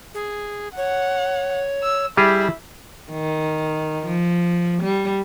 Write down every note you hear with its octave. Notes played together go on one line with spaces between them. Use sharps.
G#4
C#5 F#5
E6
G3 E4 G4 G#4
D#3
F3
G3